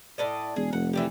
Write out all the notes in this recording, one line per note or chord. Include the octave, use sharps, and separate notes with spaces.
A2 D5 D#5
E1 G#4
F1 F#5
E3 D4 G4